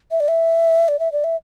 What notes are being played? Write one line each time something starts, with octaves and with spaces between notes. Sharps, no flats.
E5
D5
E5
D5
E5
D5
E5